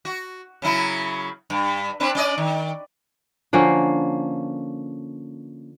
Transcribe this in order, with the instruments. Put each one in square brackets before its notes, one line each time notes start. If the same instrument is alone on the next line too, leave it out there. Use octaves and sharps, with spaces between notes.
[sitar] F#4
C#3 F#3 E4
G2
C4 D4 B4
C#4 D5 D#5
D#3
[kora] D3 F3 A#3 C#4